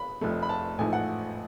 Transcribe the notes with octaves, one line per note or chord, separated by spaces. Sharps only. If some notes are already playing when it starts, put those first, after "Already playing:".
Already playing: B5
F1 F2 F3 A3
B5
A5
A1 G#2 F3 A3 G#5
F#5